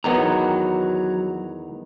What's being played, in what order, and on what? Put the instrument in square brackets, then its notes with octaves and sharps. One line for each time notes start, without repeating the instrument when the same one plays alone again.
[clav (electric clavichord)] E2 D#3 B3 [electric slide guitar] F#3 A#5